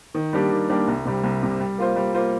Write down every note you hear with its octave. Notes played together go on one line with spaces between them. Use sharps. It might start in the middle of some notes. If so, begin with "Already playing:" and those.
D#3
G3 A#3 D4 G4
D#3
G3 A#3 D4 G4
C2
C3 G3
C2
C3 G3
G3
A#3 F4 C5
G3
A#3 F4 C5